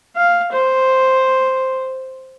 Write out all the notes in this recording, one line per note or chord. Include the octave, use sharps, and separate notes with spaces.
F5
C5